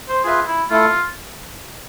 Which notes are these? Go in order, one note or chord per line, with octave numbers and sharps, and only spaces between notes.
C5
F4 G#4 B4 E5
E4
A3 E4 F4 A4